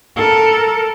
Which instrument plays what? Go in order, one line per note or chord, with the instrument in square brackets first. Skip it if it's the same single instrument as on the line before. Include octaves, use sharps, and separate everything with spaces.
[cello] A4 A#4